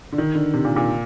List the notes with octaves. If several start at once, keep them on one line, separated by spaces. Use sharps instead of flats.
D3
D#3
D3
C3
A#2
A#2